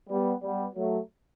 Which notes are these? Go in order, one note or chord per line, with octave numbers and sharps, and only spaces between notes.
G3 B3
G3 B3
F#3 A3